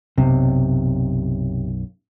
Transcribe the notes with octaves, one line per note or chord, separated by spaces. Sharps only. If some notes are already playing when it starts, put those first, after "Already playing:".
B1 F#2 C3